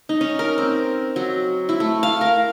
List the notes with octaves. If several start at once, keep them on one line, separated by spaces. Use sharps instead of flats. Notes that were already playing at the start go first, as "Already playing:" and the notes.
D#4
C#4
A#4
C4
F#3
E4
A3
F5
A#4